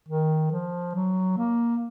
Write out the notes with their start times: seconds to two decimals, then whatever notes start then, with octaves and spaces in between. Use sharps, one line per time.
0.09 D#3
0.52 F3
0.95 F#3
1.38 A#3